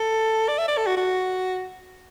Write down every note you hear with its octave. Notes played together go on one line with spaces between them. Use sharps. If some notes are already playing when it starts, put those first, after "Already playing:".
Already playing: A4
D5
E5
D5
A4
F#4
F#4